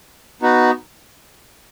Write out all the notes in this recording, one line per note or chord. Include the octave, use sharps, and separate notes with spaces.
B3 D#4 F#4